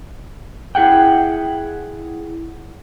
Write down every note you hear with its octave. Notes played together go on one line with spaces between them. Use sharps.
E4 G#4 F#5 G5